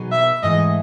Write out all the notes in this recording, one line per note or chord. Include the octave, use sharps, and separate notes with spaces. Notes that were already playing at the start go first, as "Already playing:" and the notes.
Already playing: B2 F#3 B3 D#4 G#4
E5
G#2 E3 A3 E4 D#5